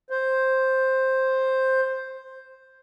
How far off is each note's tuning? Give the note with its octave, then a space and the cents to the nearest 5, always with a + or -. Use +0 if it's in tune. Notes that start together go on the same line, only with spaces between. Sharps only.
C5 +5